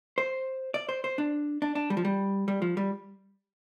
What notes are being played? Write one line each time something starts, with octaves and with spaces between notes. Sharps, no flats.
C5
D5
C5
C5
D4
D4
D4
G3
F3
G3
G3
F3
G3